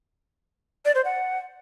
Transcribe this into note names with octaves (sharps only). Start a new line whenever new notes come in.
D5
C5
F#5